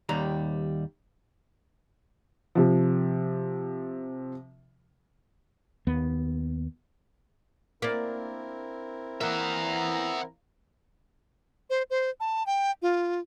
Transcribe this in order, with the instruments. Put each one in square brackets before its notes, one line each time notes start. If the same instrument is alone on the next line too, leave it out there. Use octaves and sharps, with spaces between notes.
[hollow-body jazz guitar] D#2 G3 A#5
[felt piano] C3 F3
[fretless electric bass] D#2 B3
[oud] A#3 D4 [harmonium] C4 E4 A#4
[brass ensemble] E3 A#5 [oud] A#3 [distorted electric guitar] E5 F#5
[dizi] C5
C5
A5
G5
F4